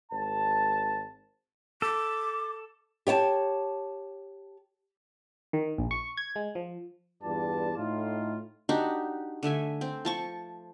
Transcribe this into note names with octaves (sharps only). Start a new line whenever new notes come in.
G#1 A5
A4 D6
G4 C#5 G5 A5
D#3
A#1
C#6
G#6
G#3
F3
E2 G2 F4 B4 D5 A5
A2 D#4 F4
D4 D#4 F#4 G4
D3 A3 E5 G#5
C4
F3 A5 C#6